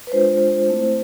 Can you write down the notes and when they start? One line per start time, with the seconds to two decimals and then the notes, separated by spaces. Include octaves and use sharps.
0.07 B4
0.12 G#3 D4 F4 C5
0.69 A3 C4 E4